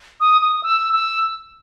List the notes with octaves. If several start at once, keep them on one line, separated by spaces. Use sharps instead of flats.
D#6
D#6
E6
E6